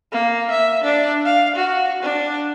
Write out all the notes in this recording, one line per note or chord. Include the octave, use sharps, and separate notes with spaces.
A#3
E5
D4
F5
F#4
D4